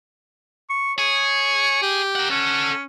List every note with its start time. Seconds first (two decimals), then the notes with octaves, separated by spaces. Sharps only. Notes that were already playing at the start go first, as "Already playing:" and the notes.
0.69 C#6
0.98 G#4 C#5
1.82 G4
2.15 A#4 F#5
2.30 C#4 A4 F#5